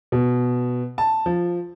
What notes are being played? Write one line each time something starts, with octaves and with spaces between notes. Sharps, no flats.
B2
A5
F3